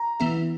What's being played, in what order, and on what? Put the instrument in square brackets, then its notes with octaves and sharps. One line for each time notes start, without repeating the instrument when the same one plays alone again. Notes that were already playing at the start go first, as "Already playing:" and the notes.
Already playing: [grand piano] A#5
[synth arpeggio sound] E3 B3 E4